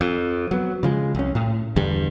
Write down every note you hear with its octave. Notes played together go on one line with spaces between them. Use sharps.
F2
F#3 B3
C#3 F3 G#3
C2 C#4
A2
E2 G2 D3 G3